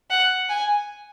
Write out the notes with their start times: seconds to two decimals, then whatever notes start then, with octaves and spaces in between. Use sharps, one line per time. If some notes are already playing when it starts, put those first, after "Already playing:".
0.10 F#5
0.49 G#5